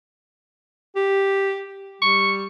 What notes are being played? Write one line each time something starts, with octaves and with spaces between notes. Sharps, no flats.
G4
G3 C#6